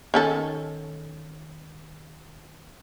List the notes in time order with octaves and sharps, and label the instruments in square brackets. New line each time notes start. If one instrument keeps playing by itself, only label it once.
[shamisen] D#3 C#4 A4